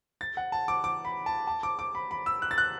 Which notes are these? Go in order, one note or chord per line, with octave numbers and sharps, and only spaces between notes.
A6
F#5
A5
D6
D6
B5
A5
A5
D6
D6
B5
B5
E6
F#6
A6
F#6